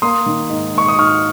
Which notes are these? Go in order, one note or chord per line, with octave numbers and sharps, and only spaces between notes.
A#3 C6 D#6
D#3
G#2
G#2 C#6
D#6
G#2 C#6 F6